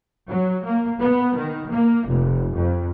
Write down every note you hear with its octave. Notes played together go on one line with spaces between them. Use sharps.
F#3
A#3
B3
D#3
A#3
F1
F2